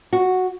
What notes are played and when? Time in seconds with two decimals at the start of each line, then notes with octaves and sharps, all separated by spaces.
0.13 F#4